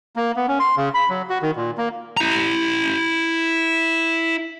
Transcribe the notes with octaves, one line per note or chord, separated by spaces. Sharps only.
A#3
B3
C#4
C6
C#3
B5
F#3
F#4
D#3
A#2
A#3
E4 A#5